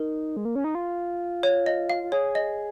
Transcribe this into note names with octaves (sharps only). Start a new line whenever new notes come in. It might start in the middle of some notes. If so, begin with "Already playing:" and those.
Already playing: D#4 A#4
G#3
A#3
C#4
D#4
F4
C#5
D#5
F5
F4
G#4 C#5
D#5